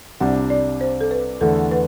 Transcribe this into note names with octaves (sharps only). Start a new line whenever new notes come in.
C2 C3 G3 D4 F#5
D5
C5
A4
B4
E2 D3 A3 A4
B4